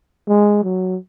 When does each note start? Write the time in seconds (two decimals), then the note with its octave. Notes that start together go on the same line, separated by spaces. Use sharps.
0.28 G#3
0.64 F#3